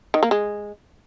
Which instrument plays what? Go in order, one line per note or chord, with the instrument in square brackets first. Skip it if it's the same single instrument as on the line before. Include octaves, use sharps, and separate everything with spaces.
[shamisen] D#3
A#3
G#3